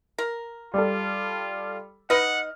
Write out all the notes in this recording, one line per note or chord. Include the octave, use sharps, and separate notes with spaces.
A#4
G3 F4 A4
D#4 B4 D#5 F#5 F6